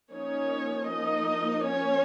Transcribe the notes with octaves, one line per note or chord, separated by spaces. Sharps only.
F3 A#3 C#4 D#4 C#5
D#4 D#5
C#4 C#5